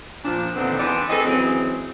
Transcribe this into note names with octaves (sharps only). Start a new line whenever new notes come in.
A#2 F3 D4
E2 A#2 D3 D#3 B3 C4
E2 E3 B3 C4 D4 D5
C4 G#4 A4 B4 D#5
C#3 E3 F#3 G#3 C4